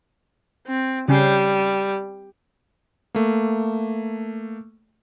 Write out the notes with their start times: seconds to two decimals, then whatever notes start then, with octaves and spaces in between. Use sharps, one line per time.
0.67 C4
1.08 C#3 G3 C#4 C7
3.15 A3 A#3